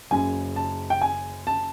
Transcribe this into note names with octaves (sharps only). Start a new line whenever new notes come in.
F#1 F#2 C#3 G#5
A5
G5
G#5
A5